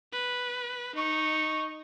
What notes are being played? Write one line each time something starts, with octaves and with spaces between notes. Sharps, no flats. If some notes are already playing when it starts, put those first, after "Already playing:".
B4
D#4 D#5 C#6